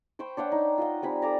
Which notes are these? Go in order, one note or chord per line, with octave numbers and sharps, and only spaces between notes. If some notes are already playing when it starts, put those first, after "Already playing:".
C5 G5 B5 C#6
D4 C#5 F#5 G5
D#4
F4 D#5 F#5
G3 C4 G#5 B5
A4 D5 A#5